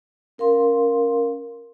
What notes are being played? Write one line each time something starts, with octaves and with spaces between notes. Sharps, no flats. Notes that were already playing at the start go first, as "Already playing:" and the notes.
C#4 A#4 F5 C6